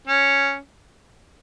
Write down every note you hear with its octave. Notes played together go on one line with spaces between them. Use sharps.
C#4